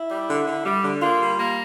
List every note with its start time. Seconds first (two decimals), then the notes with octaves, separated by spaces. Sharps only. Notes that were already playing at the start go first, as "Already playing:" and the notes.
Already playing: E4
0.10 G3
0.29 D3
0.47 D3
0.66 G3
0.83 D3
1.02 A#3 F4
1.21 G3
1.39 A#3